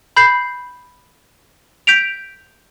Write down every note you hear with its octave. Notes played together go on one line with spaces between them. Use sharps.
B5 G6 C7
G6 B6 D7 F7